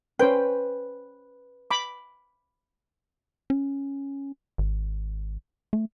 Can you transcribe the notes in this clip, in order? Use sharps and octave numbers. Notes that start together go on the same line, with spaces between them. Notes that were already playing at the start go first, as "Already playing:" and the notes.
C#4 B4 C5 G5
B5 D6
C#4
G#1
A3